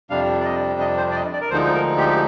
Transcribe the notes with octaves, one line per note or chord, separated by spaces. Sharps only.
F2 C3 G3 D4 F5
D5
D#5
D#5
C5
D5
D#5
D5
A#4
D2 D3 F3 G#3 D#4 C5
A#4
G4
G4